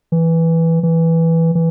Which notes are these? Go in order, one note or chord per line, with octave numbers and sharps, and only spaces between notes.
E3
E3
E3